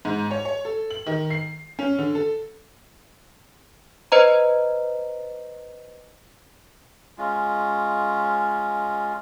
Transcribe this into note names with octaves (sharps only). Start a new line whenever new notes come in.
G#2
C#5
C#5
A4
F#7
D#3
C7
C#4
D3
A4
B4 C5 D#5 A#5
G#3 C#4 F4